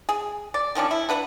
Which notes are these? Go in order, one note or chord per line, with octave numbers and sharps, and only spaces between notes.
G#4
D5
D#3 F3 C#4 D4
E4
D4 B4 F#5